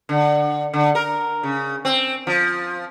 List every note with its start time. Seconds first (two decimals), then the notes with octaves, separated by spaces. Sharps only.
0.09 D3
0.73 D3
0.95 A#4
1.43 C#3
1.85 C4
2.27 F3